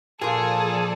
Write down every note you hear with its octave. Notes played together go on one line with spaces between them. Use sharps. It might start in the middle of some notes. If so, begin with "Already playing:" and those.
A#2 F3 F4 G#4 A4 D5